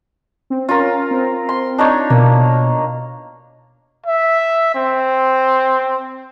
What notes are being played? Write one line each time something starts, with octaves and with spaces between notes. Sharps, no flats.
C4
C#4 F4 A#4
C4
C6
D4 D#4 C#5
B2 A#3
E5
C4